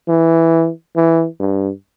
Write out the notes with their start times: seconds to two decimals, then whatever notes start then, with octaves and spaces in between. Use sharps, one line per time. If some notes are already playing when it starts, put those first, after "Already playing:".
0.09 E3
0.96 E3
1.40 G2